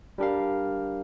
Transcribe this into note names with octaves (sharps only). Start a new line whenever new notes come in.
G3 D4 G4 A#4 F5